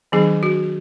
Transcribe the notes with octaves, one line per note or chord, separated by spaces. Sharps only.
D#3 F#3 B3 D4 G#4
F#4